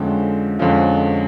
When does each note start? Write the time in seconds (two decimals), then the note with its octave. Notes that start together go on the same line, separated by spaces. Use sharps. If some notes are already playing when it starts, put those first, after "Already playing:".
Already playing: F2 D3 F3 G#3 C#4 G5
0.59 F2 D3 F3 G#3 C#4 F5